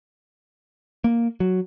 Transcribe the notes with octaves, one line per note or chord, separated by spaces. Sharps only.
A#3
F#3